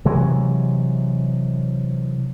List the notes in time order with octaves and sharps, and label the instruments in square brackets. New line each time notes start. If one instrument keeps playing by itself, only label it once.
[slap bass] C3 E3 F#3 G#3